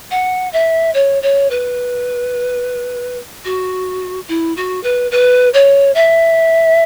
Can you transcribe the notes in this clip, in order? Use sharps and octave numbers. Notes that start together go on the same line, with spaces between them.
F#5
E5
C#5
C#5
B4
F#4
E4
F#4
B4
B4
C#5
E5